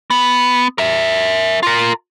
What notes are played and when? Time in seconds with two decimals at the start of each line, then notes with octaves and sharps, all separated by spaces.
0.10 B3
0.78 A#4 E5
1.63 F4 A#4